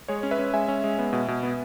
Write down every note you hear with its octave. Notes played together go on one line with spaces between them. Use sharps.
G#3 G#4 C#5
C#4
B4 E5
C#4
G#3 E5 G#5
C#4
G#3
B3
B2
B2
B3